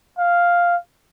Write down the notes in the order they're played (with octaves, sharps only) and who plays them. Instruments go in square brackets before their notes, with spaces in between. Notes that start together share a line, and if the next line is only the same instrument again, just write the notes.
[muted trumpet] F5